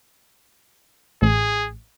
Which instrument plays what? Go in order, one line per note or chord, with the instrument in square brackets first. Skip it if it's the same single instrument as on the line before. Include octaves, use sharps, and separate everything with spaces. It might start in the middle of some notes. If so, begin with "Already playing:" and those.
[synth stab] A1 [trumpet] G#4